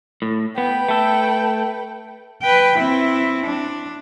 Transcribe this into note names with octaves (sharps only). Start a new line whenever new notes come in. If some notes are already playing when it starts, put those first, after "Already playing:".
A2
B3 B4 G5
A3 A4
B4 G5
C4 E4
D4